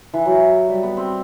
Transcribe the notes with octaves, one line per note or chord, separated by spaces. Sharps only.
E3
F#3
G3
B3
C4